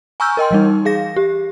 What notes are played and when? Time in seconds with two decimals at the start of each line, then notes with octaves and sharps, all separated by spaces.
0.20 G#5 A#5 C#6 E6 F6 G6
0.37 A#4 D#5 G5 C6
0.51 E3 G3 D#4
0.85 G#4 F5 A#6
1.16 G4